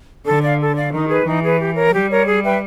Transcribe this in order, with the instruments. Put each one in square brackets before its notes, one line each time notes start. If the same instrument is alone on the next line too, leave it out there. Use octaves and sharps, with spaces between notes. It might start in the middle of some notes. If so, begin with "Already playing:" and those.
[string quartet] D3 [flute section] A4
[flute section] D5 F5
A4
D5 F5
[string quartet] D#3 [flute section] D#4
[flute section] G#4 B4
[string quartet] E3 [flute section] D#4
[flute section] G#4 B4
G4
A#4 C#5
[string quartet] G3 [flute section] G4
[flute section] A#4 C#5
G#4
B4 E5 G5